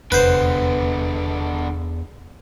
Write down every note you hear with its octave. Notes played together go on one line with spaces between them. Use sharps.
F1 E2 D3 B3 B4 C5